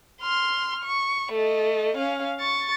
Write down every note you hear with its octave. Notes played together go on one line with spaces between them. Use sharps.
C6 F6
C#6
A3 D#5
C#4 F5
C#6 A6